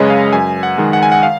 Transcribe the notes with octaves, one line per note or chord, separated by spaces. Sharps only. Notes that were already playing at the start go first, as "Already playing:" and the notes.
Already playing: F#2 C#3 G#3 G#4 B4 C#5 D#5
F5
F#2 G#5
F#5
D#3 G#3
F#5
G#5
F#5
F5